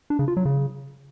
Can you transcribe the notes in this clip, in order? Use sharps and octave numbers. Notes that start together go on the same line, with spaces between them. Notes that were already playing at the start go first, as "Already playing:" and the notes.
D4
C#3
F4
F#3
C#3